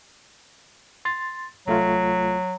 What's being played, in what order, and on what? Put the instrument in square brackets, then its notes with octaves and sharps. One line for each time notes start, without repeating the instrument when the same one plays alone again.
[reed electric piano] C6 A6
[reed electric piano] C2 A3 F4 [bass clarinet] F#3